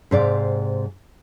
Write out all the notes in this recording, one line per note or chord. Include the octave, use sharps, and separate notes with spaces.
G#2 C3 D5 F5